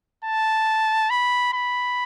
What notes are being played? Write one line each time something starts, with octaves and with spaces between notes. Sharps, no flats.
A5
B5
B5